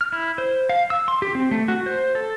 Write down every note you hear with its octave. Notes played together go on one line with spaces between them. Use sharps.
F6
E4
C5
F5
E6
C6
G4
C4
A3
F#4
C5
A4